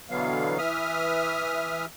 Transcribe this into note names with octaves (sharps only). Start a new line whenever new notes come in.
B2 D3 E3 F#3 B3 F5
E3 E5 D#6 F6